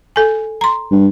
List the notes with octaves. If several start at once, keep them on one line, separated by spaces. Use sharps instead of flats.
A4 G#5
A#5 C6
G2